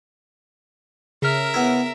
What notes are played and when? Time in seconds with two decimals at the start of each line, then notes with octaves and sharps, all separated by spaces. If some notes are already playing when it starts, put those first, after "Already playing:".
1.22 C#3 A#4 E5 F6
1.54 B3 E4